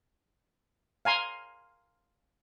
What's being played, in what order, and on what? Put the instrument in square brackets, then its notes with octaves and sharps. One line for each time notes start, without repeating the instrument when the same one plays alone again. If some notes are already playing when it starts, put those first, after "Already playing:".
[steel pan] F5 G#5 A#5 C6